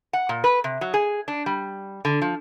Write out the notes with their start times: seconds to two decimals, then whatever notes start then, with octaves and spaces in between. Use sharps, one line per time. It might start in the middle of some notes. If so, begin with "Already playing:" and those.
0.13 F#5
0.29 A#2
0.44 B4
0.64 C3
0.81 F#3
0.94 G#4
1.28 D4
1.46 G3
2.05 D3
2.22 F3